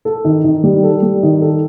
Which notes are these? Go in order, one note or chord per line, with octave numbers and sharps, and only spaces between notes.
A4
D#3
D#3
G3
A4
G3
D#3
A4